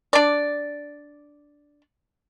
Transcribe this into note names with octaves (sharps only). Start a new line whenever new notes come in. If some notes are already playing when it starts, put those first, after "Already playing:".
D4 D5